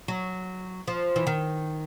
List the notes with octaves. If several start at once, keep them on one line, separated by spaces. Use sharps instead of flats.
F#3
F3
E3
D#3